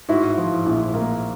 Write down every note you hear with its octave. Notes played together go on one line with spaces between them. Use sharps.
G#2 E4 F#4
F3
A#1
A#3